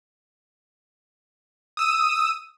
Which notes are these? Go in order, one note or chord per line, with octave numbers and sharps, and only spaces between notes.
D#6 E6 D#7